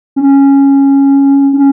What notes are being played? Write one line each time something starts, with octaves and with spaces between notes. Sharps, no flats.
C#4
C#4